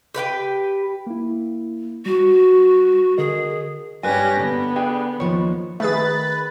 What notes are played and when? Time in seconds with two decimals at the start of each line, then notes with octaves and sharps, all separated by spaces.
0.14 G4 B4 F#5 G5
1.07 A#3 E4
2.06 G3 F#4
3.18 D3 G#4 A#4 D#5
4.03 G2 C#4 D4 G4 B4 G#5 A#6
4.40 D3 B3
4.76 D4 G#4 G5
5.20 D#2 F3 D#4 C#5
5.80 D#3 A3 G#4 B4 A6